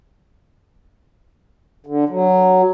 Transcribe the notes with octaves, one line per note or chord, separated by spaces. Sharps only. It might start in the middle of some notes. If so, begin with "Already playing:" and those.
D3
F#3